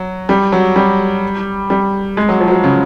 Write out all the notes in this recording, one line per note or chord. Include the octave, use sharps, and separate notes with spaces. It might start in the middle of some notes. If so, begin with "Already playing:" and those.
Already playing: F#3
G3
F#3
G3
G3
G#3
F#3
F3
F#3
F3
C#3